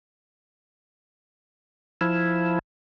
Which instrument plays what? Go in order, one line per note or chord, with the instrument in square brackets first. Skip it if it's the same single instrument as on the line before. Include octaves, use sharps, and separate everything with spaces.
[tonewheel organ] F3 E4